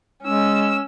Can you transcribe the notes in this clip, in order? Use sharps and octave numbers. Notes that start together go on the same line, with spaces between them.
G#3 C#4 E6